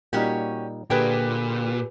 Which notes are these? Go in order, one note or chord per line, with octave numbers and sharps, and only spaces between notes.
A#2 G3 C#4 D#4 F#4 G4
A#2 D3 G4 G#4 B4 G5